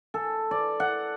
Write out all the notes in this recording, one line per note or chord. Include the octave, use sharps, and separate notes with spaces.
A4
D5
F#5